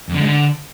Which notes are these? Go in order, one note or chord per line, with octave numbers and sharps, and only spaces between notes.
F2
D3
G#3
D3